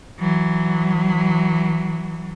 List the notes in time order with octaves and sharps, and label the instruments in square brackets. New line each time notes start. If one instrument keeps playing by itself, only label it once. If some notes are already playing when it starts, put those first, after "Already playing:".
[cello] E3 F#3